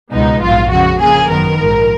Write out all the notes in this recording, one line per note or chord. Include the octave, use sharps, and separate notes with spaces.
C#2 B2 G#3 B3 D#4
A#1 G#2 F#3 F4
F2 C#3 G#3 F#4
F2 C#3 F3 A#3 G#4
G#1 F#2 D#3 F#3 B3 A#4
A#1 G#2 F3